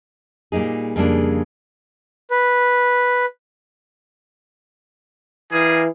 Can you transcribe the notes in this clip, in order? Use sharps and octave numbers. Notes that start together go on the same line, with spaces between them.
A#2 G3 A#3 D#4 G#4
F2 C#3 G3 G#3 A#3 D4
B4
E3 G3 A#3 G#4